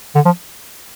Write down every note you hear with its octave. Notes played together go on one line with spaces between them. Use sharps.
D3
F3